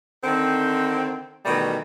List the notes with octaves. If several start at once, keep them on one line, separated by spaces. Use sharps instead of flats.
D3 D#3 C4
B2 D#3 E3 G3 A3